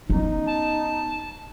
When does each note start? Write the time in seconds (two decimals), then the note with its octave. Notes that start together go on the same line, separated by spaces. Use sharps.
0.10 B3 C#4 D#4
0.47 A5